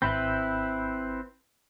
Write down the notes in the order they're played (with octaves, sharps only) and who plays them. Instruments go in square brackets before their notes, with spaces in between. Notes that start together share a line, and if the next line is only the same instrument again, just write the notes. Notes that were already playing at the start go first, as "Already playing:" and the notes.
[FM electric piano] G#1 B5 G6 [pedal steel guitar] C4 E4 B4